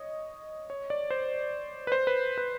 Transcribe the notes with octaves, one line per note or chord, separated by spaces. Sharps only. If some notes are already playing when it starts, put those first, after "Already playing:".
Already playing: C#5 D#5
C#5
D5
C5
B4
C5
B4
B4